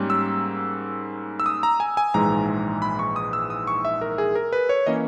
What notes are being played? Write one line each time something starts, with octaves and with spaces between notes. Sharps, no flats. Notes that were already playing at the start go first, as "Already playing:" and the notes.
Already playing: G#2 G3 A#3 C#4
E6
E6
D#6
A#5
G#5
G#5
A#1 G#2 E3 G#3 A#5
B5
C#6
D#6
E6
D#6
C#6
E5
A#4
G#4
A#4
B4
C#5
E3 A#3 C#4 D#5